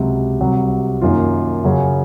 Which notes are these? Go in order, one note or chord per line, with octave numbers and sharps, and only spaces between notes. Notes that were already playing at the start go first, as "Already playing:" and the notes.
Already playing: C#2 C3 F#3
C2 C3 F#3
F#2 D#3 A#3 F4
F#2 C#3 F#3 C#4 G#4